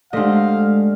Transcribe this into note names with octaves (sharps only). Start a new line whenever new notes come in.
D3 G#3 A3 G4 C5 D5 D#5 F5